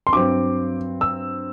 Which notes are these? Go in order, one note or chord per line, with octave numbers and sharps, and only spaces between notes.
C6
G2 F#3 C4 D6
E6